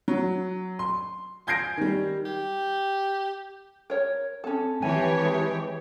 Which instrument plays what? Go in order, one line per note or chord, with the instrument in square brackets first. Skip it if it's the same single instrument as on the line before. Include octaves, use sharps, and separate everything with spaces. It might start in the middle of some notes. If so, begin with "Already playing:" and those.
[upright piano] F#3
C6
G#5 G6 G#6 A#6 C7 D7
D#3 G3
[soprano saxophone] G4
[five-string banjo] A#4 C#5
[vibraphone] C4 A5 [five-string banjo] C#4 A4
[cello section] E3 [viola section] G4 C#5 [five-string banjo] G#5
[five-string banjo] G#3